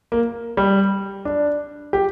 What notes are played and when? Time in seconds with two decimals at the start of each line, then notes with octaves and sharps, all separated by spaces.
0.12 A#3
0.57 G3
1.25 D4
1.93 G4